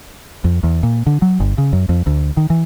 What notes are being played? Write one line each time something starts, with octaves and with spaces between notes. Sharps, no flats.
F2
E2
A#2
D3
F#3
G1
C#3
F#2
F2
D2
D#3
E3